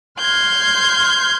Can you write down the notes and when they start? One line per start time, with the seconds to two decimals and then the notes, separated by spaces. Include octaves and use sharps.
0.20 C6 F6 G6 G#6